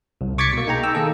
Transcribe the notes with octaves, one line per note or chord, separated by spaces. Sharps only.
C2
C#6 D6 G#6 A6 B6 C#7
B2 A#3
D#4 G#4 G5 A#5
G5 E6
D#3 A#3 G#4 A4